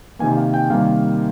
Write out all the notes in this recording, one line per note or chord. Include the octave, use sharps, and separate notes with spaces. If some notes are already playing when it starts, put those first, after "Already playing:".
C3 D#3 A#3 G#5
F5
G5
C3 D#3 G3 A#3 F5